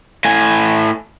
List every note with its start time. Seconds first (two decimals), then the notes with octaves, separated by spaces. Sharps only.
0.25 A2 G#5